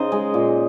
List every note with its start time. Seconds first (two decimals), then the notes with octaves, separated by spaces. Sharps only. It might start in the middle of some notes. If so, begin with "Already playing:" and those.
Already playing: C#3 D#4 C5 D#5
0.12 G#3
0.34 A#2